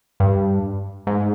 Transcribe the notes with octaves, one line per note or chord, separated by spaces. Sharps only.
G2
G#2